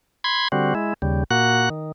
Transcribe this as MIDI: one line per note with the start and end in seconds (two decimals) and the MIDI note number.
0.24 0.48 83
0.24 0.48 84
0.24 0.48 92
0.52 0.74 50
0.52 0.74 55
0.52 0.74 60
0.52 0.74 66
0.75 0.94 56
0.75 0.94 64
1.02 1.24 39
1.02 1.24 49
1.02 1.24 55
1.31 1.69 46
1.31 1.69 58
1.31 1.69 66
1.31 1.69 78
1.31 1.69 90
1.70 1.92 51